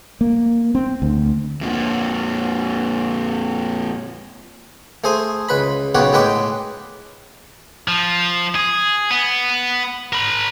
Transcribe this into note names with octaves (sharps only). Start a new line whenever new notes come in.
A#3
C4
D2
F2 A#2
A3 G#4 C5 G#5
C#2 B4 B5
B1 C#3 G4 C#5 F#5
A2 G#3 B4 G5 D6
F3
G#4
B3
A#4 B5